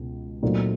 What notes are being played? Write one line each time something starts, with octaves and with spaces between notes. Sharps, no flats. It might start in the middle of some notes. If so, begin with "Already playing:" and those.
Already playing: C#2 B2
A#2 F#3 A3 C4 D#4